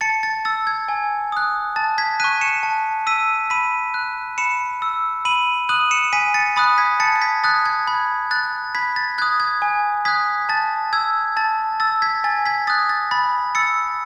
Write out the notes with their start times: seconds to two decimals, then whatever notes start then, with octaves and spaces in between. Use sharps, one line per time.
0.01 A5 A6 C#7
0.23 A6
0.45 E6 A6
0.67 G#6
0.88 G#5
1.32 D#6 F#6
1.76 A5 A6
1.98 G#6 B6
2.20 C#6 F#6 B6 D#7
2.41 C#7 E7
2.63 A5
3.07 E6 B6 D#7
3.50 B5 B6 D#7
3.94 F#6
4.38 B5 C#7 E7
4.82 E6
5.25 B5 D#7 F#7
5.69 D#6 F#6 D#7 F#7
5.91 C#7 E7
6.13 G#5 B6 D#7
6.34 A6 C#7
6.56 B5 D#6 F#6 A6
6.78 G#6 B6
7.00 A5 A6 C#7
7.16 A6
7.21 G#6 B6
7.44 D#6 F#6 A6
7.66 G#6
7.87 B5 G#6
8.31 F#6 A6
8.75 B5 G#6 B6
8.96 A6
9.18 D#6 F#6 G#6
9.40 G#6
9.62 G#5
10.05 D#6 F#6 G#6 B6
10.49 A5 A6
10.93 E6 G#6
11.37 A5 A6
11.80 E6 A6
12.02 G#6 B6
12.24 G#5 A6
12.46 G#6 B6
12.67 D#6 F#6 A6
12.89 A6
13.11 B5 A6
13.55 E6 A6 C#7